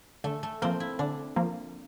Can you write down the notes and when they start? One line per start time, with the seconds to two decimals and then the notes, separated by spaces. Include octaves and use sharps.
0.24 D3 A3
0.43 A3
0.62 F3 A#3 C4
0.80 E4
0.99 D3 D4
1.36 F3 A#3